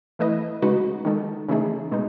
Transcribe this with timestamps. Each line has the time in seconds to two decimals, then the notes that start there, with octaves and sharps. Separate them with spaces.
0.19 E3 A3 E4 B4 D#5
0.62 C#3 G#3 D#4 F#4 B4
1.05 D#3 G#3 D#4 A4
1.49 C#3 E3 A3 D#4 G#4
1.91 B2 G#3 D#4